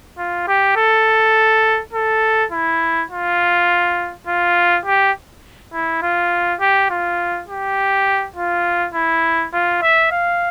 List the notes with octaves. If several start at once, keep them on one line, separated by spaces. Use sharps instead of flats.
F4
G4
A4
A4
E4
F4
F4
G4
E4
F4
G4
F4
G4
F4
E4
F4
E5
F5